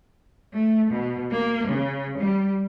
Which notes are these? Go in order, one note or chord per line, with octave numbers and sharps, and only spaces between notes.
A3
B2
A#3
C#3
G3